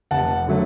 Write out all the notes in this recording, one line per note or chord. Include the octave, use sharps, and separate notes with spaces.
F1 F#5 A5
D3 F#3 A3